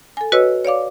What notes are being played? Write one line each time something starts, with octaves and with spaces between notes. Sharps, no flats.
A4 G#5
F#4 B4 C#5 D#5 E6
C#5 D5 F5 D6